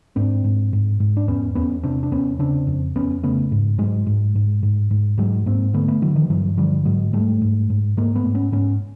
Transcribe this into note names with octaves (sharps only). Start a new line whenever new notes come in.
G#2 C4 D4
G#2
G#2
G#2
D4
E2 B3 C#4
E2 B3 C#4
C3 C4 D4
D4
E2 B3 C#4
C#3 C4 D4
F2
F2 B3 C#4
C#3 A3 B3
G#2
G#2 F#3 G#3
G#2
G#2
G#2
G#2
G#2 F#3 G#3
G#2 A#3 C4
D3 A3 B3
A3 B3
D3 E3 F#3
D#3 F3
G2 E3 F#3
D3 F3 G3
G#2 F#3 G#3
G#2 G3 A3
G#2
G#2
G#2 G#3 A#3
A3 B3
G#2
B3 C#4
G#2 B3 C#4